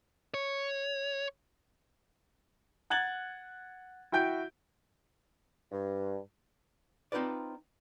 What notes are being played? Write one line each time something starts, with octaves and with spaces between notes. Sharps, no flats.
C#5
F#5 F#6 G#6 A6 F#7
E4 F#4 G5 G6 D7
G2
C4 D#4 F4 B4 D5